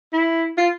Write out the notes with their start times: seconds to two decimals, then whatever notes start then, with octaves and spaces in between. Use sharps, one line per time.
0.13 E4
0.58 F4